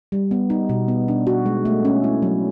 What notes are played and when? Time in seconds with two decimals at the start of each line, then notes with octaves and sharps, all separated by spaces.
0.12 G3
0.31 B3
0.50 D#4
0.69 B2
0.88 B3
1.08 D4
1.27 F#4
1.46 G#3
1.65 A3
1.85 C#4
2.04 E4
2.22 F#3